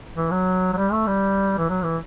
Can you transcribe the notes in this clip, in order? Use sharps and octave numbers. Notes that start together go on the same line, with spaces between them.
E3
F#3
F#3
G3
A3
G3
E3
F#3
E3